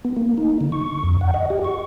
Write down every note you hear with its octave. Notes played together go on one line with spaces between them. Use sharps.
B3
A#3
D#4
D3
C#6
F2
F#5
D#5
G4
C#6